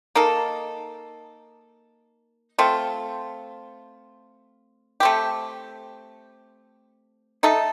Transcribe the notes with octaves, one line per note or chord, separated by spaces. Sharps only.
A#3 D#4 A4
A3 C4 F4
A3 C4 G4
A3 D#4 A4